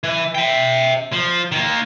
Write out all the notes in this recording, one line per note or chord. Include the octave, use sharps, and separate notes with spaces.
E3
E5 G5
F3
D#3 A#3